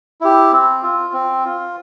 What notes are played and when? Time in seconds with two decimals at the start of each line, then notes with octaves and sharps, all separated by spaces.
0.21 E4 G4
0.52 C4
0.83 F4
1.13 C4
1.45 F4